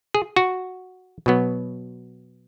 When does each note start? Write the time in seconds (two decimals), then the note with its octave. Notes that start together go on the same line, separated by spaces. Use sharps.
0.14 G#4
0.36 F#4
1.26 B2 F#3 B3